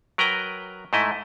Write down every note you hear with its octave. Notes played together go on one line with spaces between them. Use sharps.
F#3 A#4 B4 G5 A#5
G#2 A3 E4 D#5